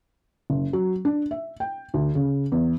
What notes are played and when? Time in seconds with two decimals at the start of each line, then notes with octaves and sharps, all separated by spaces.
0.50 F#1
0.73 F#3
1.05 D4
1.31 E5
1.60 G5
1.94 D2
2.15 C#3
2.52 E2